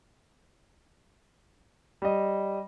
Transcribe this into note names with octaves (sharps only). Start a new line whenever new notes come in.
G3 D#5